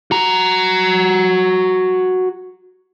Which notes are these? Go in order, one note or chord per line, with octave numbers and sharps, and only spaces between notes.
F#4 A#5